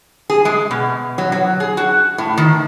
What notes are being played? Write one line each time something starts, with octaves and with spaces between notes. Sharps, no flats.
G#4
G#3
B2
F#3
F#3
G#4
F#4
A2
D#3